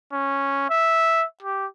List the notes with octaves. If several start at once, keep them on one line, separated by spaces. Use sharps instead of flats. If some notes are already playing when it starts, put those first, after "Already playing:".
C#4
E5
G4